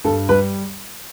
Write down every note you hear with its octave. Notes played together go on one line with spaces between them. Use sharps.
G2 A4
G3 B4